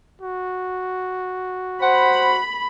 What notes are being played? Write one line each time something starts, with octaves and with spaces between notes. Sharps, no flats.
F#4
C5 F#5 B5